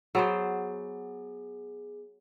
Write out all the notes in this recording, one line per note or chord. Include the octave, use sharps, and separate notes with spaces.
F#3 B3 G#4 C5